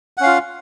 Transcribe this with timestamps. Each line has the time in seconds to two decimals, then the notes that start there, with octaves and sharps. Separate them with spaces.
0.17 F#5
0.20 C#4
0.23 F5
0.26 F4